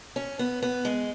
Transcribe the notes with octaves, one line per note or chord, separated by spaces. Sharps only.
C#4
B3
B3
G#3